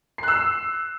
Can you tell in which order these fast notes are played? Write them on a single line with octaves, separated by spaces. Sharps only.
C7 F#6 E6